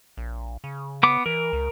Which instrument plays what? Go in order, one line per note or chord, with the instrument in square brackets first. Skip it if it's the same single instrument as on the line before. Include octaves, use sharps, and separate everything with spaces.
[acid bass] A#1
C#3
[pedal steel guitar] B3 D6
[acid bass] E3 [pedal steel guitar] A#4
[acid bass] C#2